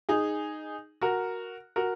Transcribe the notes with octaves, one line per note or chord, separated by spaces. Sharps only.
D#4 G#4
F#4 A#4
F#4 A#4